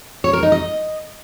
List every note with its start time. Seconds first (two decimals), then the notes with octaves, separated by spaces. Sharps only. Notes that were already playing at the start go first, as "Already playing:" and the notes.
0.24 C#5
0.33 A#4
0.43 D#4
0.52 D#5